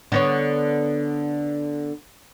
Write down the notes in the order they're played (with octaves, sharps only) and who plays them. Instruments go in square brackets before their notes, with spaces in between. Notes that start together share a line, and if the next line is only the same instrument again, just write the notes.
[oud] D3 B3 C#5